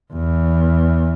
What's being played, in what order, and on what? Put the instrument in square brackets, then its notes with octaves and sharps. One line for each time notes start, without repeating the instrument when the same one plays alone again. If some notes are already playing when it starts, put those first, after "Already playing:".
[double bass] E2